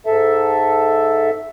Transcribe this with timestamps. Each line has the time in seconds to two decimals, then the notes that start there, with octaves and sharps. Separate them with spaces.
0.06 G#2 A4 E5